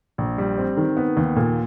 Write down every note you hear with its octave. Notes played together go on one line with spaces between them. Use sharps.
A#1
G3
C4
D#3
B3
D#2
A#2